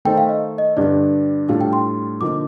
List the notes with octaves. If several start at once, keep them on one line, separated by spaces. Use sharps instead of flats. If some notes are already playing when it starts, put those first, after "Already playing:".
D#3 A3 D#4 A4 C5 G5
F5
D#5
D#5
G2 D3 G3 D4 D5
A2 G3 D4 F4 A4 F5
G5
C6
D3 F3 A#3 D#4 D6